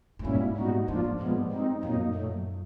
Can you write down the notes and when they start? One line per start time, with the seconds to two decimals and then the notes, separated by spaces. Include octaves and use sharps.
0.19 A2
0.24 G#2 B2 G3 A#3 C#4 E4
0.57 A#2 G3 B3 D#4 F#4
0.88 G#2 F3 A#3 D4 F4
1.04 G#2
1.20 G2 A#2 F3 G#3 B3
1.51 G#3 C4 D#4
1.83 F#2 A#2 F#3 A#3 D#4
2.15 A#2 F#3 A3